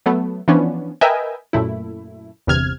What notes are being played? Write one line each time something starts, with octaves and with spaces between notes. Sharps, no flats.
F#3 A3 B3
E3 F3 B3 C#4 D4
A#4 B4 D#5 E5 G5 G#5
F#2 A#2 A3 E4
G1 E2 C3 F6 G#6